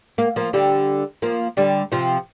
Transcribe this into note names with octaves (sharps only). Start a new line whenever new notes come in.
A#3
F3 A#3
D3 G3
F3 A#3
D3 G3
C3 F3